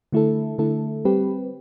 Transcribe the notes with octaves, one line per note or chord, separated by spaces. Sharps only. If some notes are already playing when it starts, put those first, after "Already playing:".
D3 A3 E4 A4
D3 A3 E4 A4
G3 C4 G4 B4